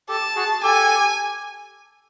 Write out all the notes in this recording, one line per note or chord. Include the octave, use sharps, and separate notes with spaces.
G4 A4 A5
F#4 G#4
G4 A4 G#5